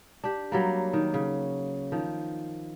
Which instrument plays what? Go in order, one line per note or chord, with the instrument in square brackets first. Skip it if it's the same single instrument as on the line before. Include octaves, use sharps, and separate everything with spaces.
[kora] D4 G4
F#3 G3 A#3
D#3
C#3
D#3 F3